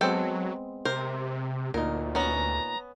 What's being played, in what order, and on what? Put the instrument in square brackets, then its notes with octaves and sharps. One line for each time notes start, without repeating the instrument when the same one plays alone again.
[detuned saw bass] F#3 [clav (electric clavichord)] G#3 B3 C4 [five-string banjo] A4 G5
[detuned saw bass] C3 [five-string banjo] A#4 C5
[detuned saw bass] D2 [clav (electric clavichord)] A#2 D#4 [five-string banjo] A#4
[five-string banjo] B3 C#4 [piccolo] A#5